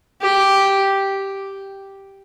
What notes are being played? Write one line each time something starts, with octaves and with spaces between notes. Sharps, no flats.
G4